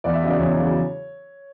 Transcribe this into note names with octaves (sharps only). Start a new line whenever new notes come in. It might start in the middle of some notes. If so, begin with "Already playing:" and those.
E2 D5
E5
C#3 F#3 D#5
D5
E2 C#5
C#3 F#3